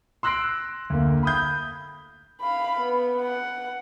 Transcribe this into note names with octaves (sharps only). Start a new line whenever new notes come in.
C6 E6 F#6 A#6 C7 D7
D2 A#3
B5 D#6 G6
F5 B5
B3
F#5